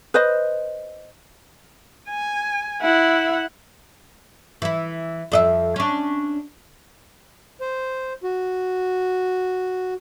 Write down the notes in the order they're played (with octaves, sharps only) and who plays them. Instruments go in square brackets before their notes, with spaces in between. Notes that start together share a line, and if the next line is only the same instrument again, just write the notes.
[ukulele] B4 C5 D#5
[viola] G#5
E4 F#5
[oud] E3 E4
F2 D#5 E5
C#4 D4
[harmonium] C5
F#4